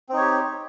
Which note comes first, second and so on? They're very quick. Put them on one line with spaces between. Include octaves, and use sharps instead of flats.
C4 D#4 C#5 G4